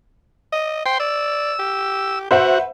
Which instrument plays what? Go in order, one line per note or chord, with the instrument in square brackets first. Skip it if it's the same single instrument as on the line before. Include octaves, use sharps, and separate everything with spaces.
[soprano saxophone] D#5
[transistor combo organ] C5 C6 [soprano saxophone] G5
[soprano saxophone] D5 [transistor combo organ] E6
[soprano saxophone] G4
[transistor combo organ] F#4 [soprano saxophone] B4 [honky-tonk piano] C5 E5 F#5